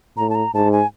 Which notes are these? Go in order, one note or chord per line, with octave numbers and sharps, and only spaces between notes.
A2 A#5
A5
A#5
G#2 A5
G#5